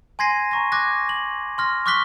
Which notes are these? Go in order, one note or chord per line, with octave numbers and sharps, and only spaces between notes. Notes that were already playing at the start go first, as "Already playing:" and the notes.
G#5 C6 G#6 A#6 C7 D#7
A#5 C#6 A#6
D6 F#6 G#6 A#6
F#7
C6 F6 A#6
C#6 D6 F6 F#6 B6 G7